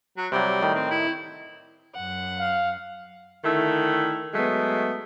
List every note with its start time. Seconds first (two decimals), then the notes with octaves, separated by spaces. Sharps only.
0.17 F#3
0.32 C3 F#3 G3
0.62 A2 D#3
0.75 C4
0.90 E4
1.96 F#2 F#5
2.39 F5
3.44 D3 D#3 A3 E4
4.34 F#3 G#3 A3 B3